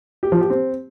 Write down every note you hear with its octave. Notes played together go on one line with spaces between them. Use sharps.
G4
F3
G4
C4